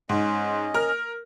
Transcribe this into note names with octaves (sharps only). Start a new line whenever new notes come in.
G#2 C#4 D#5
A#4 F6